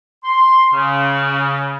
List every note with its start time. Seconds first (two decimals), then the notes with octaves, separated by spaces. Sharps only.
0.24 C6
0.73 C#3